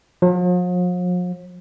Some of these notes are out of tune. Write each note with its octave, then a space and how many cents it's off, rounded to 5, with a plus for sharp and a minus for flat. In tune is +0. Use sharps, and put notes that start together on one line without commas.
F3 +45